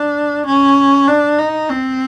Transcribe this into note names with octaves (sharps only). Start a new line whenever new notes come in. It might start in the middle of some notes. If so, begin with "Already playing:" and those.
Already playing: D4
C#4
D4
D#4
C4